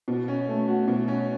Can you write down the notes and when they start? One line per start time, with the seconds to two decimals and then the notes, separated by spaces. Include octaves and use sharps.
0.08 B2
0.28 C#4
0.48 A3
0.68 F#4
0.88 B2
1.08 C#4